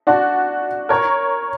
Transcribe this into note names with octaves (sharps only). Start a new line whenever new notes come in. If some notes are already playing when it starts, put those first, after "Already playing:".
D4 F#4
A#4 C#5